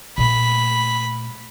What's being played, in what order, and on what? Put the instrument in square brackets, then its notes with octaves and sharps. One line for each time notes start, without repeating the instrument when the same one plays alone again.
[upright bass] A#2 A3 [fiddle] B5